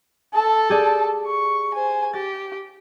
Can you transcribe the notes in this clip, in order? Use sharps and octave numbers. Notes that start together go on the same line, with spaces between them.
A4 A5
G4 G#4 D5
C#6
C5 G#5
G4 A6